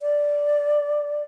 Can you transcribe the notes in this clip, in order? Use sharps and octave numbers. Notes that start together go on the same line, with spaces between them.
D5